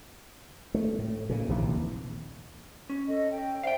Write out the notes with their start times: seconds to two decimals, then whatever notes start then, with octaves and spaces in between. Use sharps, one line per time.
0.74 A3
0.99 A2
1.29 A#2 C#3
1.49 A#1 D#2 C3 E3
2.89 C#4
3.07 A4 D#5
3.31 G5
3.63 C5 D5 E5 F5 G5